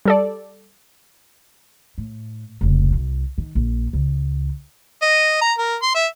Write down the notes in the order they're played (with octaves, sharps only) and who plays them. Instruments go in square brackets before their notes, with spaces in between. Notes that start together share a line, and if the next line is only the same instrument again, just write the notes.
[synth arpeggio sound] G3 A4 D5
[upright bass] A2
F1 C#2
C2
D#3
A#1
C#2
[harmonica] D#5
A#5
A#4
C6
E5